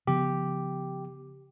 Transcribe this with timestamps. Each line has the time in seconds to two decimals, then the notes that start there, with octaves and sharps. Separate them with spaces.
0.07 C#3 F3 B3 G4